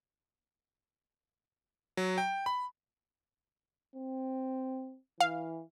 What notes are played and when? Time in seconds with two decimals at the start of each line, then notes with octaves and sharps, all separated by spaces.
1.97 F#3
2.18 G5
2.46 B5
3.96 C4
5.20 E3 F5